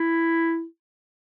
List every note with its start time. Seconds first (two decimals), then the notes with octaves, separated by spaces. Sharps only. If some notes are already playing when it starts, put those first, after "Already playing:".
Already playing: E4